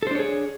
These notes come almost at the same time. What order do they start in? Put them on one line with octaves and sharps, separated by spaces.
A4 C5 D4 C#5 G#4